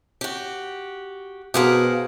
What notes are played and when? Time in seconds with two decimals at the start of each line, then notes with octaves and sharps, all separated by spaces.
0.21 F#4 G4
1.54 B2 G4 G#4 A#4 C5 F5 F#5